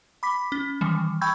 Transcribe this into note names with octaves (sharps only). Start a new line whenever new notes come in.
B5 D6 B6
C#4
D#3 E3 G3
G5 B5 C#6 E6 G6 G#6